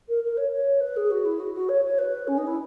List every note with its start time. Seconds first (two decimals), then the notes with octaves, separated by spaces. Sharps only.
0.08 A#4
0.23 A#4
0.37 C#5
0.51 C#5
0.80 B4
0.96 G#4
1.10 F#4
1.25 E4
1.39 F#4
1.54 F#4
1.68 C#5
1.84 C#5
1.98 B4
2.27 C#4
2.37 D#4
2.47 E4